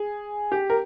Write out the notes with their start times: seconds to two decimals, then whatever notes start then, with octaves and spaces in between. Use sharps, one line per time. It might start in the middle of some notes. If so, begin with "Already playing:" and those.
Already playing: G#4
0.52 G4
0.70 A#4